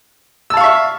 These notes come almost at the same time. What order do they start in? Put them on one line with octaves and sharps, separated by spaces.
E6 A5 F5 C#6 E5